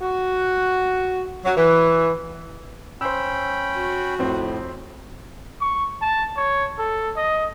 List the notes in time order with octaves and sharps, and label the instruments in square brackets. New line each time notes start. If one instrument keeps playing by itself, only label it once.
[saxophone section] F#4
F#3
E3
[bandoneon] C#4 G5 B5 [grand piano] C5 E6
[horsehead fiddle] F#4
[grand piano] F2 C4 [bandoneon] A2
[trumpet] C#6
A5
C#5
A4
D#5